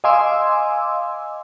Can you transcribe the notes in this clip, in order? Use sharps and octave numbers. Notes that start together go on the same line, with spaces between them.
D#5 F5 G#5 C6 D6 E6